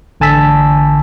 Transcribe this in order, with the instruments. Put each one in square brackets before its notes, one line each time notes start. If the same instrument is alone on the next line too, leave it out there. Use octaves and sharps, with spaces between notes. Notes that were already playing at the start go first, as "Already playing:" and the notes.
[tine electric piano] A1 D3 G#5 A5 E6 B6